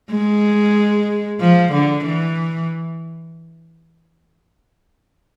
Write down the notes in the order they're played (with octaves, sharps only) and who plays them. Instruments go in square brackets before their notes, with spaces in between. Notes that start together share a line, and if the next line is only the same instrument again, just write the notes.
[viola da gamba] G#3
F3
D3
E3